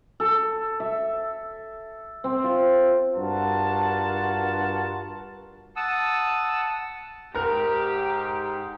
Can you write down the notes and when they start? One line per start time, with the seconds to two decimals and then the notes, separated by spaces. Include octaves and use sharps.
0.20 A4
0.80 E5
2.24 C4
2.44 F4
3.16 G2 F4 F#4 A#4 F#5 A5
5.76 F#5 A5 D#6 E6
7.35 G#2 G4 A#4 A#5